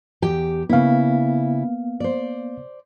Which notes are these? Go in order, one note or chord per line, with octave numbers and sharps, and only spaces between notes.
E2 G4 G5
C#3 A#3 B3 E4 F5
C5 D5